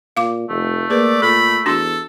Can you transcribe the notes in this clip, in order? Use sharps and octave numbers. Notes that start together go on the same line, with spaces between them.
A#2 F5 D6
F1 A3
A#3 G#4 B4 D5
A#2 A4 B5
E2 D4 F#4 A4 C6